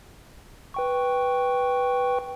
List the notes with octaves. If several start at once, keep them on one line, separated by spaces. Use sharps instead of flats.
B4 G5 C#6